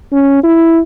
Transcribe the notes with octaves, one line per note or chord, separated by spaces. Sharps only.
C#4
E4